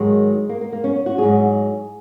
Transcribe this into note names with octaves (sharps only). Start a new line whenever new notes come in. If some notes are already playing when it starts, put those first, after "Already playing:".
Already playing: G#2 D#3 F#3 G#3
A#3
A#3
A#3
C#4
C#4
F#4
G#2 F#3 G#4